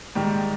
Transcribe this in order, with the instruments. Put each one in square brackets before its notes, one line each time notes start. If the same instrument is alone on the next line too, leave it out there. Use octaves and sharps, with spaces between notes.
[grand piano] G#2 D#3 G3